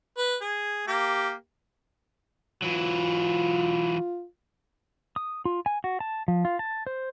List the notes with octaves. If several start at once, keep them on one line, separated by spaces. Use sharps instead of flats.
B4
G#4
A#3 G4
E3 F#3 F4
D#6
F4
G#5
F#4
A5
F3
F4
A5
C5